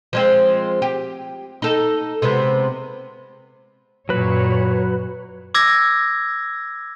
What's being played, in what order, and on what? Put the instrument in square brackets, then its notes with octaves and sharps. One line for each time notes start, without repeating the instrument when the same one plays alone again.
[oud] F3 G#3 C4
G4
D#4 A4
C3 G#3 B3
[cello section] F#2 A#2 C#5 [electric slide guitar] F#3 B4
[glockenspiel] D6 E6 G#6 A#6